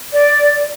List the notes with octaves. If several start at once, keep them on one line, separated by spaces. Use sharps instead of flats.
D5